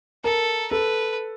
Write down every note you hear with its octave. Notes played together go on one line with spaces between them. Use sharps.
A4 A#4
A4 B4